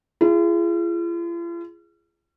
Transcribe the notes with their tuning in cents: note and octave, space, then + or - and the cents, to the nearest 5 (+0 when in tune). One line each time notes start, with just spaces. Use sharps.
F4 -45 G#4 +0